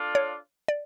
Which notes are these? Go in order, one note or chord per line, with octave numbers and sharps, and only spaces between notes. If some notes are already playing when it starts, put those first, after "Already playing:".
Already playing: D4 F4 A4 D5 F5
C#5
D5